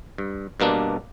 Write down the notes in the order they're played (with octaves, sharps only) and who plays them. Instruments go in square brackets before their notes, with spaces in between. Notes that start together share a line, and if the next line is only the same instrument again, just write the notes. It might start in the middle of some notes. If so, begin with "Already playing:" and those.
[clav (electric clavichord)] G2
G2 B2 A#3 D4